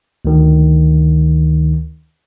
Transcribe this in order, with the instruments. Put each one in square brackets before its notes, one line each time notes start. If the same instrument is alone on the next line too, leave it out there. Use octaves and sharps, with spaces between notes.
[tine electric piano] D2 D#3